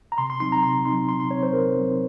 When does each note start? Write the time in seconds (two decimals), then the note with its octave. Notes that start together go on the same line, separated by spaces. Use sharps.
0.12 A#5
0.18 C3 C6
0.30 C6
0.40 F#3 C4 D#4 C6
0.52 A#5
0.63 C3 C6
0.85 F#3 C4 D#4 C6
1.09 C3 C6
1.20 C6
1.31 F#3 C4 D#4 C#5
1.43 C5
1.53 C3 A#4
1.76 F#3 C4 D#4